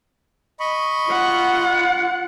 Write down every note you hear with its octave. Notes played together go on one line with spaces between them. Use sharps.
D#5 B5 C#6
F4 F#5